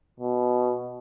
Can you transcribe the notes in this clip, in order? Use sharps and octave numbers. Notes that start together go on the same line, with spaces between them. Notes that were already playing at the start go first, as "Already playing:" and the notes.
B2